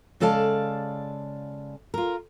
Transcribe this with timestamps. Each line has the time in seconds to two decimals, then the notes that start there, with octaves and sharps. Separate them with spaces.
0.20 C#3 G#3 A4 D5 F5 A5
1.94 F4 A#4